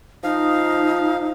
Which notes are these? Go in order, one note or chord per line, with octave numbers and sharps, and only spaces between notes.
F3 D#4 F5